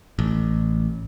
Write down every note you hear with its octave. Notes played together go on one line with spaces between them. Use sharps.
A1